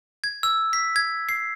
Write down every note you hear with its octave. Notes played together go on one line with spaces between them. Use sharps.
G#6
E6
B6
G#6
C7